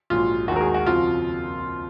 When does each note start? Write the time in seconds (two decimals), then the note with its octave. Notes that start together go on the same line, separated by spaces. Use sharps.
0.10 A#1 G#2 F#3 F4
0.48 D#2 D#3 G#3 F#4
0.56 A#4
0.61 G#4
0.74 F#4
0.86 F2 C#3 F3 F4